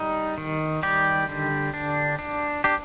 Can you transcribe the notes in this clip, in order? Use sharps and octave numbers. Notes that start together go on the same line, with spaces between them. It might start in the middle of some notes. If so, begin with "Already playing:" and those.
Already playing: G3 D#4
D#3
G3 G4
D3
D4
D4
D4 G4